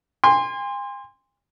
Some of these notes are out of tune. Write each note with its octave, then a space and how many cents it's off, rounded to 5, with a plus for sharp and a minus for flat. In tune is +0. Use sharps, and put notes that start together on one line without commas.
G#5 -45 C6 +0